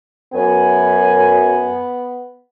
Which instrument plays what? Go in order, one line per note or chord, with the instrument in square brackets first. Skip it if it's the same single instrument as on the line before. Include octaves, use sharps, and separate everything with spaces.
[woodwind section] F#2 G#5 [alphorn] B3